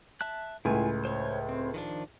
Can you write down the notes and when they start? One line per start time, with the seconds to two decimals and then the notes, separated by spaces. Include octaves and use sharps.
0.21 E5 A5 F#6
0.65 C#2 A2 E4 F4 G#5
1.05 C5 C#5
1.49 C4
1.74 D#3 F3 D4